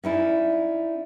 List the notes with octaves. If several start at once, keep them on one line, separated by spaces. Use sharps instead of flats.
C#4 D#4 E4 D5